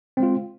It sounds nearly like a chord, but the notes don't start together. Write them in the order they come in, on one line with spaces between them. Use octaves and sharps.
C4 G#3 F4